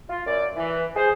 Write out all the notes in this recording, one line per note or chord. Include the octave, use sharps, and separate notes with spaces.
F4
F#2 D5
E3
G#4 C5